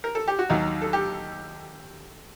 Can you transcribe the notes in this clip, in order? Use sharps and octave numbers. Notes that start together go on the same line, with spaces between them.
A#4
A4
G4
F#4
D#2 D#3 F#3 D#4
A4
G4